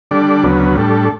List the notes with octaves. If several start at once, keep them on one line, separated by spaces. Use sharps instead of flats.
D3 G3 D4 A4 D5
D2 C#3 F#3 B3
A2 G3 D4 A4